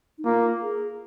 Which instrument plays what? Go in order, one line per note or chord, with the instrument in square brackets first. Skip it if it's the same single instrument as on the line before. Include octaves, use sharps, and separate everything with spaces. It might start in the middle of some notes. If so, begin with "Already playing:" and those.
[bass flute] D#4
[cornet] A#3 [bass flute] F4
[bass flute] G#4